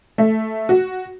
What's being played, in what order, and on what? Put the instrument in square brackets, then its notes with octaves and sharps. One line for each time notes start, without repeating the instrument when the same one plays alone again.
[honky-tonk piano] A3
F#4